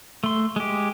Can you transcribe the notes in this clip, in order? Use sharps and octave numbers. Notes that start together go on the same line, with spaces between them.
A3 C6
G#3 G4